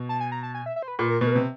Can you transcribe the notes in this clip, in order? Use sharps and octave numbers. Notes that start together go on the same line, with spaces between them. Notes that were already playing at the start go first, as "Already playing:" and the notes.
Already playing: B2
A5
G#5
A#5
A5
G#5
E5
E5
C5
B4
A#2 B4
A#4
B2 B4
A#4
C3 B4